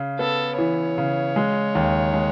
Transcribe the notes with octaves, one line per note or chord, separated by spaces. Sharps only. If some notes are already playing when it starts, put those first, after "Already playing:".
Already playing: C#3
B3 A4
E3 C#5
C#3
G#3
D#2
G#3